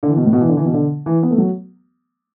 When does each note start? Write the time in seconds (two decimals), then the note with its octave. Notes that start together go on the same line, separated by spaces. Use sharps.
0.03 D3
0.09 E3
0.17 B2
0.25 A2
0.33 B2
0.41 E3
0.49 D3
0.57 E3
0.65 B2
0.74 D3
1.06 E3
1.23 B3
1.31 A3
1.38 F#3